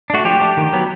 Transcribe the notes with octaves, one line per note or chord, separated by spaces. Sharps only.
A3 D4 F#4
F3 G4
A3 D4
D#3
F#3 B3